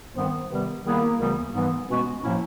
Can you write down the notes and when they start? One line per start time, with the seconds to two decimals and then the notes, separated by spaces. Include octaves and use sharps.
0.15 G2 D#3 G3 B3 C4
0.50 C3 D#3 G3 B3
0.84 D#3 G3 A#3 B3 E4 G#4
1.19 D2 C#3 E3 G3 B3
1.53 G#2 E3 G3 B3
1.89 B2 G#3 B3 C#4 F#4
2.24 A2 F3 A#3 C#4 E4